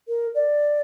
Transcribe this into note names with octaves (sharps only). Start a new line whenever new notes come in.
A#4
D5